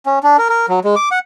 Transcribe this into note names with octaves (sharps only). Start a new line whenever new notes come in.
C#4
D4
A#4
A#4
F#3
G#3
D6
F#5